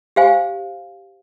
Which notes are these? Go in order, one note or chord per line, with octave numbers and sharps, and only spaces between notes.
G4 C5 F5 G#5